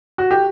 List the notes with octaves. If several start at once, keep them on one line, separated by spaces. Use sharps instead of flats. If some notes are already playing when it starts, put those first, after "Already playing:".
F#4
G4